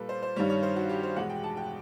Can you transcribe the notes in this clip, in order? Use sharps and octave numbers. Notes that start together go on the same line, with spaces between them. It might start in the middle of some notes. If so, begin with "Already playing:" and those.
Already playing: A#2 G3 A4 B4
C5
C5
G2 D#3 G3 C#5
C#5
C5
F#4
G4
C5
E2 B2 G#3 F#5
G5
A5
G5